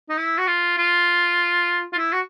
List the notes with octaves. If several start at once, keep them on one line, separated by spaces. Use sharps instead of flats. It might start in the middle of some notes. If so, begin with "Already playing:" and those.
D#4
E4
F#4
F4
F4
F4
E4
F#4